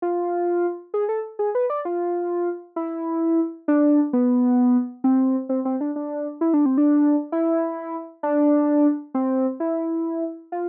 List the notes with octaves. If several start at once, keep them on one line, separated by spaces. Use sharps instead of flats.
F4
G#4
A4
G#4
B4
D5
F4
E4
D4
B3
C4
C4
C4
D4
D4
E4
D4
C4
D4
E4
D4
C4
E4
F4